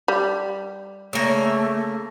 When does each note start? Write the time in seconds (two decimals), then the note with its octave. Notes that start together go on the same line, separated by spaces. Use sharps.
0.08 G3
1.13 C#3 A3 A#3